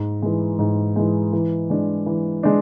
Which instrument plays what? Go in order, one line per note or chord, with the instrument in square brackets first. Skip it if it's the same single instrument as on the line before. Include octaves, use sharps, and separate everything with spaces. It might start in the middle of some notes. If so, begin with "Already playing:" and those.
Already playing: [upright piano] G#2
E3 G#3
G#2
E3 G#3
E3
G#3 D4
E3
G#3 D4